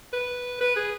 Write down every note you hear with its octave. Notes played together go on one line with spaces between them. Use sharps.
B4
B4
G#4